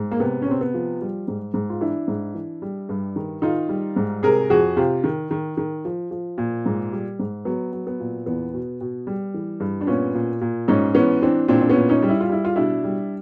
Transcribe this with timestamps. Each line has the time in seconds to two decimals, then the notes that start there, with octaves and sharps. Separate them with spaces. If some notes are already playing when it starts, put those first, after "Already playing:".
Already playing: G#2
0.11 A#3
0.20 C3 B3
0.42 C#4
0.48 C3 C4
0.61 B3
0.74 F3
1.01 G3
1.28 G#2
1.54 G#2
1.70 F4
1.81 E3 D4 E4
2.08 G#2
2.35 E3
2.62 G3
2.89 G2
3.16 D#3
3.42 D#3 D#4 F4
3.69 G3
3.96 G#2
4.23 C3 G#4 A#4
4.50 F2 F#4 G#4
4.77 C3 F4 G4
5.04 D#3
5.31 D#3
5.57 D#3
5.85 F3
6.11 F3
6.38 A#2
6.66 G#2
6.92 G3
7.19 G#2
7.45 F#3 B3
7.72 F#3
7.87 B3
8.00 A#2
8.26 E2 B3
8.54 B2
8.81 B2
9.07 G3
9.34 E3
9.60 G2
9.81 D4
9.87 A#2 B3 C#4
10.14 A#2
10.41 A#2
10.68 G#2 C#4 D#4
10.95 E3 B3 C#4
11.22 E3 C4 D4
11.48 A#2 C4 D4
11.61 D4
11.69 B3 C#4
11.76 A#2
11.89 C#4 D#4
12.02 G3
12.09 E4
12.20 F4
12.29 G3 E4
12.45 F4
12.56 B2 D4 E4
12.84 G3